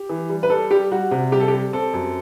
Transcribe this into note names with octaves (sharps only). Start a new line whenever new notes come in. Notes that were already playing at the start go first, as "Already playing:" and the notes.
Already playing: G4
E3
G3
B4
G3 A4
G3 G4
G3 F#4
C3
G3 G4
A4
G3 G4
C4 A4
F#2